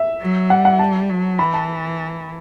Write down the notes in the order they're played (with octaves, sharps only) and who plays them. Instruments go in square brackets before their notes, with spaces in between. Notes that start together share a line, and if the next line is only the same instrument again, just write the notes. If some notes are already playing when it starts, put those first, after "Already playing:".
Already playing: [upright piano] E5
[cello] F#3
[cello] G3 [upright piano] F#5
[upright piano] F#5
A5
[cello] F#3
[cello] E3 [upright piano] B5
[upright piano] A5